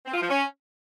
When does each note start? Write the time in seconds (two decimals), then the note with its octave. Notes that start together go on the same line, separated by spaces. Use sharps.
0.06 C4
0.14 F4
0.22 F3
0.30 C#4